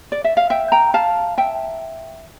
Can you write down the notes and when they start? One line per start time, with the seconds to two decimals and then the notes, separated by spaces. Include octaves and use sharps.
0.12 D5
0.24 E5
0.37 F5
0.50 E5 G5
0.72 G5 A#5
0.94 F5 A5
1.38 E5 G5